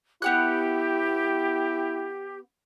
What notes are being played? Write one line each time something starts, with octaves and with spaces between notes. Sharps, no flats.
B3 E4 G4 F#5 F#6